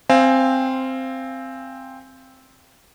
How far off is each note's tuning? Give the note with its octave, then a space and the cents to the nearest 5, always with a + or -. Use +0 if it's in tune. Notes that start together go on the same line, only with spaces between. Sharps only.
C4 +0 F5 -20 G#5 -10